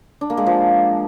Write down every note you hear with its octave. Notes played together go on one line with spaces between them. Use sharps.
D4
A#3
G#3
F3